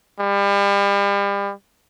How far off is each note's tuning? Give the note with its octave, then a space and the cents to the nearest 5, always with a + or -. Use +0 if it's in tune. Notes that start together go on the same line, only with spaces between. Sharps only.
G3 +35